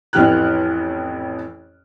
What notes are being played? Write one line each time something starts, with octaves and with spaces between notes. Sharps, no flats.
A1 F2 E3 G4 F6 F#6